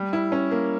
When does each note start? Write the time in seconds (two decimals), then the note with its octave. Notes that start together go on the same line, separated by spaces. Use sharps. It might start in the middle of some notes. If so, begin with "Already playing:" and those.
Already playing: G3
0.13 E4
0.32 C#4
0.51 A#3